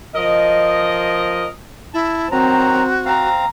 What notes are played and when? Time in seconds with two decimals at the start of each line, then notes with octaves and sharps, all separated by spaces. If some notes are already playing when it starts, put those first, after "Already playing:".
0.15 F3 A#4 D#5
1.94 E4 A5
2.31 D#3 F#3 C4 F#4 A#5
3.06 C4 F5 A#5